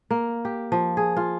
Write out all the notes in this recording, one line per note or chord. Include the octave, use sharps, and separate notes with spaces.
A#3
G4
F3
G#4
F4